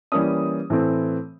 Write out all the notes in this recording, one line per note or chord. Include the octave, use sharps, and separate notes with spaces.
E3 G3 A#3 C#4 D#6
A2 E3 A3 C4